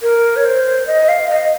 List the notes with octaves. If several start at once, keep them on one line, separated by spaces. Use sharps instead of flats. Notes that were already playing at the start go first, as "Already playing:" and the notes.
A#4
C#5
C5
D#5
F5
D#5